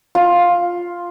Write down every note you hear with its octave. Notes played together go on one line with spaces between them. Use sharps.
F4